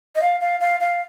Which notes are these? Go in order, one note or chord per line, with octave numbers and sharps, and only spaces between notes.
D#5
F5
F5
F5
F5